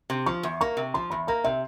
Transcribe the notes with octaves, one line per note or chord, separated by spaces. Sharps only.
C3
F3 C#6
E2
A#3 C#6
C3
F3 C6
E2 B5
A#3 A#5
C3 E5